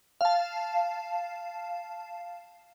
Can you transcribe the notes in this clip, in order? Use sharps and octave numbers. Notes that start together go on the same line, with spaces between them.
F5 A5